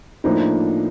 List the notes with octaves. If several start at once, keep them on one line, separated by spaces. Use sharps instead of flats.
A2 F3 A#3 D4 D#4